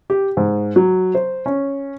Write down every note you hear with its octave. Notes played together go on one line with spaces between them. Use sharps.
G4
G#2
F#3
C5
C#4